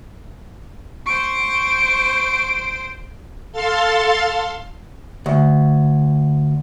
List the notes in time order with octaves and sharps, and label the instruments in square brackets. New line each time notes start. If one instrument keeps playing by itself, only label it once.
[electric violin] C5 D7 [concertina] C#6
[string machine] A4 F5 C6 A6
[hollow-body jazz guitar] D2